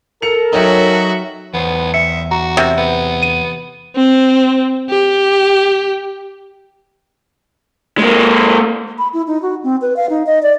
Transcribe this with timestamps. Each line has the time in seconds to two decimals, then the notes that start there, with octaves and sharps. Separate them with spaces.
0.22 A4 A#4 C#7 F7
0.53 F#3 D#4 F#4 C#5 E5 G5
1.54 E2 B3 C5
1.94 E5 C#7
2.31 F#4 A#5
2.57 C3
2.78 B3
3.23 D#7
3.96 C4
4.90 G4
7.98 G#3 A#3
8.98 B5
9.13 E4
9.27 D#4
9.42 F#4
9.64 C4
9.82 B4
9.96 F5
10.10 D#4
10.27 D#5
10.43 D5